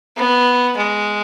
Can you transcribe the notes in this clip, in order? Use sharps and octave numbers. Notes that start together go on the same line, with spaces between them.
B3
G#3